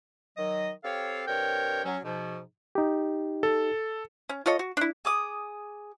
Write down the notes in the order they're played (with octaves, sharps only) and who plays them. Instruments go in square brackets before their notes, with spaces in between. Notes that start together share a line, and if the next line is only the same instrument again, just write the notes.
[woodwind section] D#3 F#3 D#5
C4 G4 A4 C#5 F5
G2 C3 A#4 C#5 G5
F#3 C#4
G#2 B2 F3
[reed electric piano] D#4 G4
[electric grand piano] A4
[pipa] C#4
F4 A4 C#5 D#5
F#4
D4 E4
[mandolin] G#4 D6 D#6